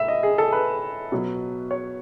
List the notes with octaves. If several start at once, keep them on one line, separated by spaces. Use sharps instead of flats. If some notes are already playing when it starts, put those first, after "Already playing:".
Already playing: A2 E5
D#5
G#4
A4
B4
B2 F#3
C#5